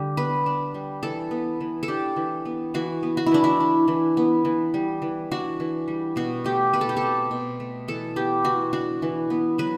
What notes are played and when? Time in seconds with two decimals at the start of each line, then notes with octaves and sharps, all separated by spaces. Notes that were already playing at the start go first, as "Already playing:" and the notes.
Already playing: D3 G3 D4 G4
0.17 B3 B4
0.46 D4
0.74 G3
1.03 E3 A4
1.31 B3
1.60 E3
1.83 A4
1.88 D4 G4
2.16 E3
2.45 B3
2.74 E3 F#4
3.03 B3
3.17 F#4
3.26 E4
3.32 E3 D4
3.44 E4
3.60 D4
3.88 E3
4.17 B3
4.45 E3
4.74 G3
5.02 E3
5.31 D4 F#4
5.60 E3
5.88 G3
6.16 B2 F#4
6.44 A3 G4
6.73 B2 B4
6.81 A4
6.89 G4
6.97 C4 A4
7.31 B2
7.60 A3
7.88 E3 A4
8.16 B3 G4
8.45 E3 F#4
8.73 D4 F#4
9.02 E3
9.30 B3
9.58 F#3 B4